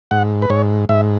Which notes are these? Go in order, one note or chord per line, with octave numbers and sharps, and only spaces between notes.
G#2 F#5
B4
G#2 C#5
G#2 E5